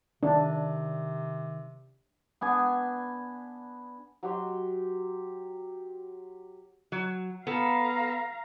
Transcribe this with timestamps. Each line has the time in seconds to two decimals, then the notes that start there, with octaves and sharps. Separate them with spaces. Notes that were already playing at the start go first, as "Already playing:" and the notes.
0.23 C3 D#3 D4
2.41 B3 D4 G#5
4.23 F#3 F#4 G4 C6
6.92 F#3
7.47 B3 A4 F5 A#5